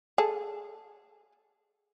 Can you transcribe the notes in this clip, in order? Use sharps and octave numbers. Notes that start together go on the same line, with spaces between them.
G#4 A4